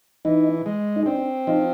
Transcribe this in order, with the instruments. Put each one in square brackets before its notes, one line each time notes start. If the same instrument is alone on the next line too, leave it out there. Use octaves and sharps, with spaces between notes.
[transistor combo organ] E3 [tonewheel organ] D#4
[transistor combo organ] G#3
[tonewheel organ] D#4
[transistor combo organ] C4 [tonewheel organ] D4
[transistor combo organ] F3 [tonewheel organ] D#4